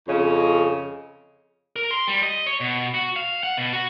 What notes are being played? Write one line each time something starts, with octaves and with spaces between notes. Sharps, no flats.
F2 C#3 C#4 D#5
A#4
C6
G3
D#5
C#5
B2
F#4
F5
F#5
B2
F#4